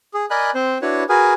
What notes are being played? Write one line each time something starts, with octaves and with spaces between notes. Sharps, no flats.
G#4
A#4 D5 D#5 G#5 B5 F#6
C4 C5
D4 E4 F#4 B4 C#5
F#4 G#4 A#4 B4 G#5